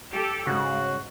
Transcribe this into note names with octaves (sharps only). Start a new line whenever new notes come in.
G4 A4
G#2 C#3 F#4